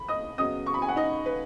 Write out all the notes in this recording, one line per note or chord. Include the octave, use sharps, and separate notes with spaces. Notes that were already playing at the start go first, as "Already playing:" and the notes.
Already playing: B5
D#5 D#6
C#3 F#3 B3 D#5 D#6
C#6
B5
G#5
F#5
D#4 D#5
B4